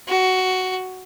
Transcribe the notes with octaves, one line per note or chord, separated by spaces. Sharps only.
F#4